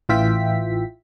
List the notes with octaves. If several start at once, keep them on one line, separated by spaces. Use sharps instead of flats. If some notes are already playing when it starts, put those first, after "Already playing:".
A1 E3 F4 E5 G5 B6